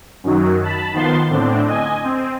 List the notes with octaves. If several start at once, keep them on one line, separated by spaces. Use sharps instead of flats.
F#2 D#3 F#3
A5 B5
D#3 F3 B3 C6 A6
A2 D3 C4 D4
D#5 G#5
C4